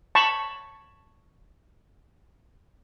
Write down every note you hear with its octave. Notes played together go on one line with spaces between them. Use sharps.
A5 B5 C#6